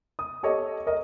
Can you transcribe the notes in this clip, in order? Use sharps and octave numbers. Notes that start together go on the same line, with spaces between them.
D#6
G4 A4 C#5 D#5
A#4 D#5